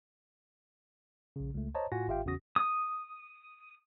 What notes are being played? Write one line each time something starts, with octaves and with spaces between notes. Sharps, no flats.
A#1 C#3
C#2 A3
C5 C#5 D#5 A5 A#5
A2 F4 F#4 F#5 G#5 A#6
G#1 F4 G4 E5 F5 G5
E2 C#3 C#4 F#4 D#6 A#6
D#6